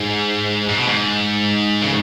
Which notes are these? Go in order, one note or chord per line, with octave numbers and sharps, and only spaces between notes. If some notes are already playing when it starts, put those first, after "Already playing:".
Already playing: G#2
G#2
B2
G#2
C#3